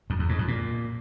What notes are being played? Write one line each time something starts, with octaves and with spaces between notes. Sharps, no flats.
F2
E2
G#2
F2
A#2